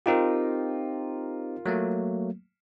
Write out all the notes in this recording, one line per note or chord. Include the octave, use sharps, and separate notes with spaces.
C4 D#4 F4 G4 A#4
F#3 A3 A#3